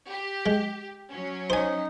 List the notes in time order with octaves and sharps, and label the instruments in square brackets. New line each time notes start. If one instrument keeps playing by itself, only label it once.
[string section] G4
[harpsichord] G#3
[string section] F#3 C#4
[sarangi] D#4 [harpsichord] C5 G#5